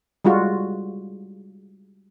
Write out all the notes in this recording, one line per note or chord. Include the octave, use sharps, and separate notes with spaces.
G3 G#3 F4 F#4